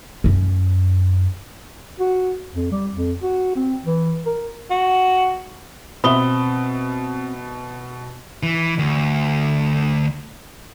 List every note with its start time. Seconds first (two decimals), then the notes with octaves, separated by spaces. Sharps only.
0.24 F#2 C#4
2.00 F#4
2.54 F2
2.72 G3
2.96 F2
3.23 F#4
3.56 C4
3.85 E3
4.26 A#4
4.71 F#4
6.04 B2 C4 E5 B5 D#6 G7
8.43 E3
8.79 D2